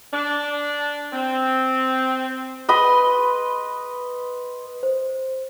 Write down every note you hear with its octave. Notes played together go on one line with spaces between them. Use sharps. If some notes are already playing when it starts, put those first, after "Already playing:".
D4
C4
B4 D#5 B5 C6
C5